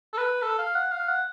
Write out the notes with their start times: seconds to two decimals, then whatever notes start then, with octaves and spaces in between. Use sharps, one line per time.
0.13 A4
0.18 B4
0.42 A4
0.59 F5
0.75 F#5
0.92 F5
1.08 F#5